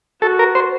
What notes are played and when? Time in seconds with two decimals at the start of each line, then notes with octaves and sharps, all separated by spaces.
0.22 F#4 A4
0.39 A#4
0.55 C5